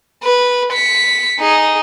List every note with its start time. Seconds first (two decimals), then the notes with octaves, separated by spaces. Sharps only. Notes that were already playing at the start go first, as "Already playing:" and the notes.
0.23 B4
0.72 B6 C#7
1.40 D#4 G#4